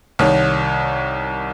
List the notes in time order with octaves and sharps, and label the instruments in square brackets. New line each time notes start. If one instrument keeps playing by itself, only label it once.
[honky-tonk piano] C2 D#3 C#5